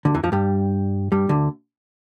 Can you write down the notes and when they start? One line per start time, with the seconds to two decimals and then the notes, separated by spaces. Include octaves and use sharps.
0.05 D2 D3
0.14 E2 E3
0.23 F2 F3
0.32 G2 G3
1.12 G2 G3
1.29 D2 D3